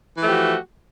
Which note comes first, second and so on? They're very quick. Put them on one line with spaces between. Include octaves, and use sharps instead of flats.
E3 A3 F3 G4 F#4